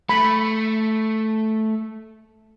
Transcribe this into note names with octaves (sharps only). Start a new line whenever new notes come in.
A3 B5